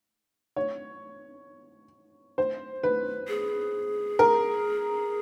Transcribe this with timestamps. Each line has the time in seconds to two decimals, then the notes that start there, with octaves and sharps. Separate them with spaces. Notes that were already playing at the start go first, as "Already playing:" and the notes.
0.56 C#5
2.38 C5
2.83 B4
3.28 G#4
4.19 A#4